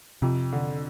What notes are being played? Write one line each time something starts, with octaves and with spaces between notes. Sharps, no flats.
F2 C3
D3